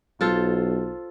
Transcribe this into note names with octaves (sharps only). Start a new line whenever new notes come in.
B1 F4 A4 C5